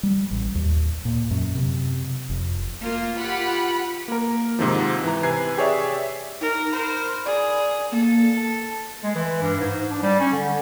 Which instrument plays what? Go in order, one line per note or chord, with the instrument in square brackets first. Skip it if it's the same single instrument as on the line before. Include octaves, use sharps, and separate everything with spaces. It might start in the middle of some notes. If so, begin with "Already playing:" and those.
[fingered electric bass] G3
A1
D#2
A#2
F#2
C3
F1
[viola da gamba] A#3 [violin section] F4
[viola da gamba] F4 G4 [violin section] F#5 B5
[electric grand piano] A#3 A#4
G#2 C3 D#3 F3
E3 A#5
C3 B4 G#5 G#6 C7
G4 G#4 C#5 D5 E5
[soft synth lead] D#4 [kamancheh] A#4
[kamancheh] A#4 C5 [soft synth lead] B5
[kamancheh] G#4 [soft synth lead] D5
[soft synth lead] A#3 [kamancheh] A4
[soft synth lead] A5
[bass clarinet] G#3
E3
G2
G#2
D4
G3
C#4
D3